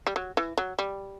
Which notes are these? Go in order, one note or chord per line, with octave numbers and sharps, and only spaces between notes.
G3
F#3
E3
F#3
G3